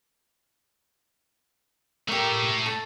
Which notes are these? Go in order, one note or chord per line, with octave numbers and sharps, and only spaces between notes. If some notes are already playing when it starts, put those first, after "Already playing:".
A3 G4 A#4 C#5
A4